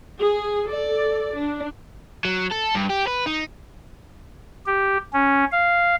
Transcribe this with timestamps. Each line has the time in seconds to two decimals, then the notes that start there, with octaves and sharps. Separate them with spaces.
0.19 G#4
0.69 A4 D5
1.34 D4
2.25 F#3
2.51 A4
2.75 G2
2.89 G4
3.07 B4
3.26 D#4
4.66 G4
5.13 C#4
5.52 F5